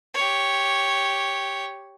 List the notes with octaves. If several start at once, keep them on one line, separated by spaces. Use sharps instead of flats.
G4 C#5